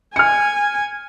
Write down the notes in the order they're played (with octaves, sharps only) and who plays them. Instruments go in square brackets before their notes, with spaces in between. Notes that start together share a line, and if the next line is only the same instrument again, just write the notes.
[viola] G#5 [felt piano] F6 C#7